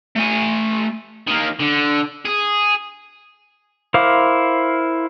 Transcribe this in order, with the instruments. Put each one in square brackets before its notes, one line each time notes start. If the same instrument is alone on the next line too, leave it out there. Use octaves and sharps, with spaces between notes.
[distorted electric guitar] A3 G#5
D#3 A#3
D3
G#4
[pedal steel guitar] E4 A#4 C5 F5 D6